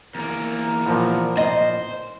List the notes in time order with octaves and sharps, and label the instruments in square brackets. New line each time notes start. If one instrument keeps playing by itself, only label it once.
[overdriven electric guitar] E2 A#3 [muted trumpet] A#4
[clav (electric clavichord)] A#2 F3 B3
[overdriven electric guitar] C5 [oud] D#5